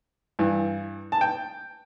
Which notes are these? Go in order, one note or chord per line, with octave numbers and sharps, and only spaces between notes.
G2 E3
A5
G5